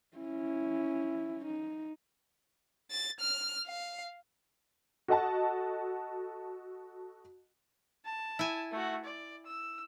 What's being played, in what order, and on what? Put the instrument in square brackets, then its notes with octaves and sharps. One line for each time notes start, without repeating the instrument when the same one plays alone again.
[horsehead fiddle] C#4 E4
D#4
[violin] A6
F6
F5
[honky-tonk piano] F#4 A4 D#5 F#5 A5
[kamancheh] A5
[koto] E4 G#5
[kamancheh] A3 F#4
D5
E6